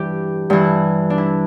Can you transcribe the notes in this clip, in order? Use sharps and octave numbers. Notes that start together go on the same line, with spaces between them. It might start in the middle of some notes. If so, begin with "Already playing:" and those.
Already playing: G2 E3 D4 G4
G2 E3
D4
E4